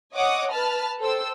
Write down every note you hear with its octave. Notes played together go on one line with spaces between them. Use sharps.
C#5 D#5 F#5 D6 D#6
B4 A5 B5 F6
A4 C5 G5 E6